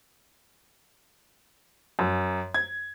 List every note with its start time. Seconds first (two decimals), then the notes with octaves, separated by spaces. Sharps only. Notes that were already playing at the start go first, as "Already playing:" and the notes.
1.99 F#2
2.54 G#6